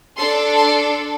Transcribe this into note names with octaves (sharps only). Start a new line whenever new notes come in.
D4 A4 C6
C6